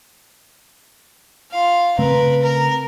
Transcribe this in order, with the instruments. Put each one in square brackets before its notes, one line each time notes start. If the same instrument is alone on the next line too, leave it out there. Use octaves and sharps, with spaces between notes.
[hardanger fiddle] F4 F5
[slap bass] C#3 A3 C4 [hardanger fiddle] A#4 B4
[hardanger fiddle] A#4